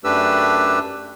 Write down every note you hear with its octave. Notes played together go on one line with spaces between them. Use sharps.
F#2 A3 D4 G4 B4 E6